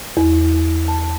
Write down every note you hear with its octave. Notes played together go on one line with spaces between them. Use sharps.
E2
A5